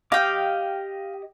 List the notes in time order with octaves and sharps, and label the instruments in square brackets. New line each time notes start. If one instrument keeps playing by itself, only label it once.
[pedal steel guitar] G4 D#5 D6 [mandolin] F5 G5